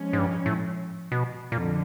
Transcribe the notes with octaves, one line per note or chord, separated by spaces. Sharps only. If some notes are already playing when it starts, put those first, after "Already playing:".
Already playing: F3 G#3 C#4
G#2
G2
A2
B2
F2 A#2 D3